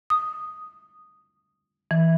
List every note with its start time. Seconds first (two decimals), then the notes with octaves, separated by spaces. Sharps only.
0.10 D#6
1.91 E3